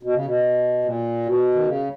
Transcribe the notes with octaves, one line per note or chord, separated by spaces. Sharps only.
B2
C#3
B2
A#2
B2
D#3
C#3